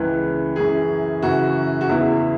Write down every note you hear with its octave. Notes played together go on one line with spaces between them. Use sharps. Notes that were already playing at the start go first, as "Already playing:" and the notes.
Already playing: C#2 C#3 E3 B4
F#2 E3 G#4
F#2 C#3 E3 F#4
F#4
E2 C#3 E3 E4